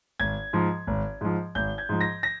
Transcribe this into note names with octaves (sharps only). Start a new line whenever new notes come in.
G#1 G#6
G#2 F3
G#1
G#2 F3
G#1 G6
G#6
G#2 F3
A#6
A#6